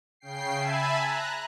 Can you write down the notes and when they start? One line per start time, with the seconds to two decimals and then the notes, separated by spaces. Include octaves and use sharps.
0.20 C#3 G5 C7
0.55 E5 G#5 A5 B5
0.99 A#5 F#6